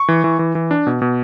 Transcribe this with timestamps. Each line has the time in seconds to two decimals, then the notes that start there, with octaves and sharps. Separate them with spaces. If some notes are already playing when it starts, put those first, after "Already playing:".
Already playing: C#6
0.08 E3
0.24 E3
0.39 E3
0.55 E3
0.71 D4
0.87 B2
1.02 B2